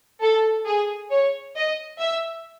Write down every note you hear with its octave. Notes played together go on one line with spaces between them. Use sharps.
A4
G#4
C#5
D#5
E5